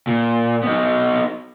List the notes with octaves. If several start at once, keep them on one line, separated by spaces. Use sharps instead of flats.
A#2
B3 D#4